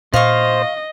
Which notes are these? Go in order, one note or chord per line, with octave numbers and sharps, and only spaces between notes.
A#2 C5 D#5 F5 C#6